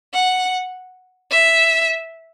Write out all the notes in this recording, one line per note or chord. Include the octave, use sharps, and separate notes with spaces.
F#5
E5